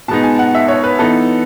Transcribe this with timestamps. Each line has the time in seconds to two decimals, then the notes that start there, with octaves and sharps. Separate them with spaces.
0.08 B2 G#3 B3 D#4 A5
0.23 G#5
0.39 F#5
0.55 E5
0.68 C#5
0.84 B4
0.99 E3 B3 D#4 A4